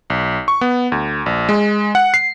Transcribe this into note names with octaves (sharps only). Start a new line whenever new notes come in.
B1
C#6
B3
D2
A#1
G#3
F#5
C7